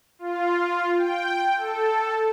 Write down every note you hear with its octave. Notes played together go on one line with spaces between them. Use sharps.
F4
G5
A4